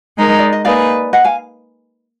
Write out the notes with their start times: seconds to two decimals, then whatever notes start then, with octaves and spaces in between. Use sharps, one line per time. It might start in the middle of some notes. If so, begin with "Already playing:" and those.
0.17 G#3 D#4 A#4
0.39 D5
0.53 D#5
0.65 A#3 D#4 G#4 B4 D5 F5
1.13 D#5 F#5
1.24 F5 G#5